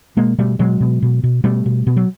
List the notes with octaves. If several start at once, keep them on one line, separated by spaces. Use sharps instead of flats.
B2 G#3 A#3
B2 G3 A3
B2 F#3 G#3
B2
B2
B2
B2 G3 A3
B2
B2
F#3